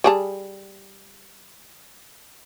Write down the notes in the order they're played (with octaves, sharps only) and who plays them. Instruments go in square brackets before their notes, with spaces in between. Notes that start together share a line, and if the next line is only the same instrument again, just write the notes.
[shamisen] G3 G#4 A5